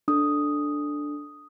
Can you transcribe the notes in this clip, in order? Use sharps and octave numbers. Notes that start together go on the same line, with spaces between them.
D4 A4 D#6